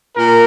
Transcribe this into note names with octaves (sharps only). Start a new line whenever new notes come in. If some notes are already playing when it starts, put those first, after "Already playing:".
A#2 A#4